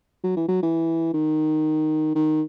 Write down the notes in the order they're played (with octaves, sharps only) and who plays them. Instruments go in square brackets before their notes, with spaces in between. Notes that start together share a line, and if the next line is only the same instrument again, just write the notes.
[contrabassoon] F#3
E3
F#3
E3
D#3
D#3